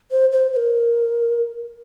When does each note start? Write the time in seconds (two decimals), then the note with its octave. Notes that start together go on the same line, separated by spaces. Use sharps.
0.11 C5
0.32 C5
0.53 C5
0.56 A#4